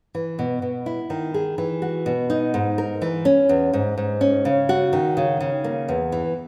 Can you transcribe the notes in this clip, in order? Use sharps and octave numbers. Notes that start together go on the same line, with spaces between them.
E3
B2
B2
E4
D#3
G#4
E3
F#4
B2
D#4
G#2
A#4
E3
C#4
E2
G#2
G#2
C#4
C#3
F#4
D#3
C#3
C#3
A#3
E2
E3